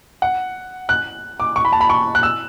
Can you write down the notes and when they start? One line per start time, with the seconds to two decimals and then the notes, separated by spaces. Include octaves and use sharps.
0.22 F#5
0.89 F#6
1.40 D6
1.56 C#6
1.65 B5
1.72 A5
1.81 B5
1.90 C#6
2.15 F#6
2.23 E6